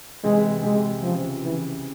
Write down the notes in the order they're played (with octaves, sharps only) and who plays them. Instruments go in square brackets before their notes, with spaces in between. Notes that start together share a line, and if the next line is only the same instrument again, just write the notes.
[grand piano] C3 E3 [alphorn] G#3
[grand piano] C3 E3 [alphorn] G#3
[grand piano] C#3 [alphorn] F3
[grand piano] C#3 [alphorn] E3